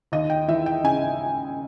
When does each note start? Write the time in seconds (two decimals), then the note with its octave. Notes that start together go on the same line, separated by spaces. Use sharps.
0.12 D#2 D#5
0.30 G5
0.48 E3 E5
0.66 G5
0.84 C#3 G#5